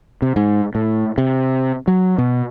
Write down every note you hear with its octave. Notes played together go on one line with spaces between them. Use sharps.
C3
G#2
A2
C3
F#3
B2